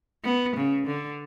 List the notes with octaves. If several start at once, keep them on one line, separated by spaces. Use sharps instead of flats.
B3
C#3
D3